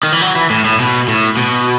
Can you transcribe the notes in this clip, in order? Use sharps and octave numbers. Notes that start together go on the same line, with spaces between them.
D#3
E3
F#3
E3
A2
A2
B2
A2
B2